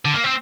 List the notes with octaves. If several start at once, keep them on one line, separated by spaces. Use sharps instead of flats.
D3
A#3
C4